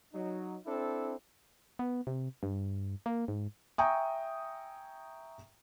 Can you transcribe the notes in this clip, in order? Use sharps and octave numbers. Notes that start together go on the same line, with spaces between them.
F#3 D#4
C4 D4 E4 A4
B3
C3
G2
A#3
G#2
E5 G5 G#5 A#5 C#6 D#6